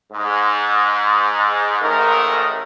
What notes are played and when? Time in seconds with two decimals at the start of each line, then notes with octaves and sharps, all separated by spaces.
0.13 G#2
1.82 A1 G#2 D#3 A3 A#4